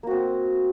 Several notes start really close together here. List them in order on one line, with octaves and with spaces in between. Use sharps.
A#3 F#4 C4